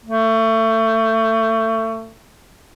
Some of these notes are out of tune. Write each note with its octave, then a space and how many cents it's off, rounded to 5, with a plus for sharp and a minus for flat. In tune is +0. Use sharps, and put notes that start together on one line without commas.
A3 +30